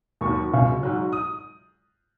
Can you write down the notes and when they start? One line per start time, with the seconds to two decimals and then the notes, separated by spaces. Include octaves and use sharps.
0.21 D#2 D#3 F#3 C#6
0.51 C#2 C#3 F#3
0.83 G#2 F#3
1.13 D#6